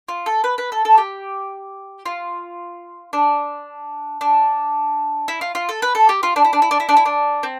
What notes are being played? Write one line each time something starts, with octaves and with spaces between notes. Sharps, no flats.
F4
A4
B4
B4
A4
A4
G4
F4
D4
D4
E4
F4
F4
A4
B4
A4
G4
F4
D4
E4
D4
E4
D4
E4
D4
E4
D4
C4